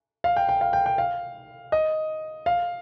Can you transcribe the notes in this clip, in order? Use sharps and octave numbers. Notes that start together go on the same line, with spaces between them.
F5
G5
G5
F5
G5
G5
F5
D#5
F5